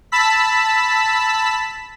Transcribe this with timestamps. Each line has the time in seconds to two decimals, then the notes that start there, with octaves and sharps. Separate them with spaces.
0.12 A5 B5 E6 B6